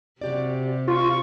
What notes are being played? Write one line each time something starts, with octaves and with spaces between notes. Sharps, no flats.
C3 F#4 G4 D5
F4 G4 C#6